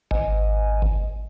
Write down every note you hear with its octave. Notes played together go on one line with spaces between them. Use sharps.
G#1